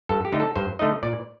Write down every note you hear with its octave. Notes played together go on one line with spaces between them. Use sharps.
G2 A4
G4
D3 A3 D#4
A4
G2 C5
D3 A3 D#4 D#5
A#2 D5